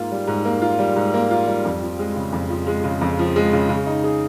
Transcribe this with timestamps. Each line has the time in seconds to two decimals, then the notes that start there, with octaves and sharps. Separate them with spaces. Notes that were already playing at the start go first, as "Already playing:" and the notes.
Already playing: G#2 A#3 F4
0.11 G3
0.28 G#2
0.45 A#3
0.61 F4
0.79 G3
0.96 G#2
1.14 A#3
1.31 F4
1.47 G3
1.65 F2
1.82 F3
1.99 G#3
2.16 C#3
2.33 F2
2.50 F3
2.67 G#3
2.84 C#3
3.01 F2
3.19 F3
3.36 G#3
3.53 C#3
3.69 C#3
3.86 D#4
4.04 G#4